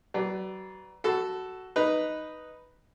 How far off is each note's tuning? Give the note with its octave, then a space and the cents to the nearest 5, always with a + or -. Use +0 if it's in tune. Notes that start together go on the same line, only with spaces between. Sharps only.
F#3 +35 B4 +5 D5 +0
F#4 +15 A4 +0 B5 +35
D#4 +0 B4 +0